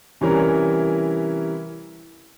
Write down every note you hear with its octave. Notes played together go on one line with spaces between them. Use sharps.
C3 E3 G3 C#4 E4 A#4